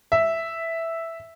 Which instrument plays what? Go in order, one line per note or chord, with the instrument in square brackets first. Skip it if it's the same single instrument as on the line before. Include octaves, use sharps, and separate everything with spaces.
[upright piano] E5